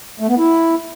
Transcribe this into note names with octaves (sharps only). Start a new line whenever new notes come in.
A3
B3
E4